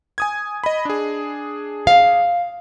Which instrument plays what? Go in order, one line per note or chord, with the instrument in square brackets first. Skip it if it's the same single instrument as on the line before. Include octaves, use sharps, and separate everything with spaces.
[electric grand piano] G#5 D#6 G#6
D#5 B5
D4 G#4
[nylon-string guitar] F5